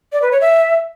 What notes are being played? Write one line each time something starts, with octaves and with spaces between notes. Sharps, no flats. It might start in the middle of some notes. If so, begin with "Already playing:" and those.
D5
B4
C#5
E5